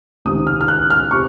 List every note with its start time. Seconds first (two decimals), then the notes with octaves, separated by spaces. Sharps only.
0.25 C#2 C3 D#3 D#6
0.47 F6
0.61 F6
0.68 F#6
0.90 F6
1.11 C3 C#6